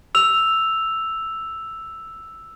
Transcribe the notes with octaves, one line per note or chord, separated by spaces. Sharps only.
E6 F7